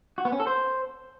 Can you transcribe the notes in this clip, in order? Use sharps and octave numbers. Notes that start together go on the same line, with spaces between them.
F#4
B3
C#4
A4
C5